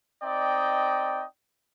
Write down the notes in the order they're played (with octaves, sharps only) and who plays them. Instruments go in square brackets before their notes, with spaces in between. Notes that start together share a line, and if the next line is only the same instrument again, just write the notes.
[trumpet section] C4 D#4 D5 D#5 G5